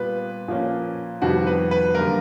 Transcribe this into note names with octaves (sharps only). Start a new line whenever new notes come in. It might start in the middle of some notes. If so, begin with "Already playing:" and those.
Already playing: A#2 G3 B3 B4
A#2 F3 A#3 C#4
F2 C3 D#3 G3 B3 F#4
B4
B4
F#2 D3 G3 A#3 A#4